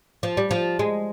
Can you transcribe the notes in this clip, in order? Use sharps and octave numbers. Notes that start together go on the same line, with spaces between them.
F3
G3
F3
G#3